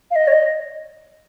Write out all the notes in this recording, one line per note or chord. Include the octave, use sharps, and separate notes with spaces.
F5
D#5
C#5
D#5